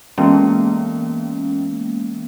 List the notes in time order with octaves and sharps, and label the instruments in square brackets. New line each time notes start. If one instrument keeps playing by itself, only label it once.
[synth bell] E3 G#3 A#3 B3 C#4